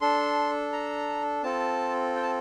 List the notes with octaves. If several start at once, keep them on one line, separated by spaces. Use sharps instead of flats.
D4 A4 C6
A#5
C4 F4 A4 A5
G5
A5